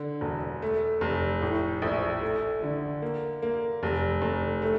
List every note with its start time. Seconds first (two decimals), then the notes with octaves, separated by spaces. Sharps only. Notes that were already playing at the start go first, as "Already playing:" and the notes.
Already playing: D3
0.21 E1
0.62 A3
1.01 F1
1.42 A2
1.82 A#1
2.21 A3
2.63 D3
3.02 A#3
3.42 A#3
3.83 F1
4.22 F1
4.62 A3